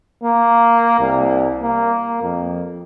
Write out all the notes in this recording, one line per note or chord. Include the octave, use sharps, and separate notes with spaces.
A#3
C2
A#3
F2